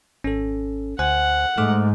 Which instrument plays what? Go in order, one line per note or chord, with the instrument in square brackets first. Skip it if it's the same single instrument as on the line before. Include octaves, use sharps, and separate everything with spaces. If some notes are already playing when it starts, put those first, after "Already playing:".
[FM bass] G#1 [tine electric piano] C#4 A4
[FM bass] D2 [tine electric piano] C5 G#5 F#6 [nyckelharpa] F#5
[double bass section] G#2 [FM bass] A3 [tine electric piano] D6 F6